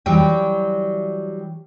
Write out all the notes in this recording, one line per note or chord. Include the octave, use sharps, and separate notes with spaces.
E3 F#3 G3 G5